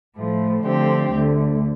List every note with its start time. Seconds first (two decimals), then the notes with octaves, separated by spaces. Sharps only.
0.16 A2 F3 A3
0.64 D3 F3 A3 C4 G4
1.11 D2 D3 A3